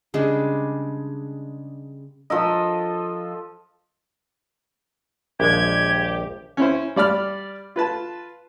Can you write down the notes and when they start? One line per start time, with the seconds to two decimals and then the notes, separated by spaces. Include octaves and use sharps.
0.14 C#3 G3 G#3 D4
2.30 F3 A4 D#5
5.40 A#1 D#2 G#3 G4 G#6
6.57 C#4 E4 C5
6.96 G3 D5 B5 F6
7.76 F4 B4 A5